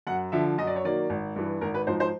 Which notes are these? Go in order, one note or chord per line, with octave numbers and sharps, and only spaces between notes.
F#2 F#5
D3 F3 E5
F#2 D#5
D5
C#5
D#3 F#3 A#3 D5
G#1
G2 E3
G#1 A#4
B4
G#2 F3 C5
C5